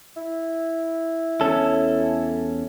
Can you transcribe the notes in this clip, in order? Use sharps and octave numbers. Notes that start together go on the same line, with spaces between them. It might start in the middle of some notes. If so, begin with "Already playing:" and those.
E4
E2 C#4 A4